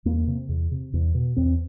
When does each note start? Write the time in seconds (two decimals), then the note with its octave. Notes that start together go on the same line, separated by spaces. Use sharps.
0.05 E2 A#3
0.27 C3
0.49 E2
0.71 C3
0.93 E2
1.15 B2
1.36 E2 C4